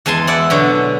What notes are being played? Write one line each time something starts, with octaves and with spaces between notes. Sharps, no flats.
E2 G#3 G#5 A5 C6
E4 D5 F#5
B2 D3 F#3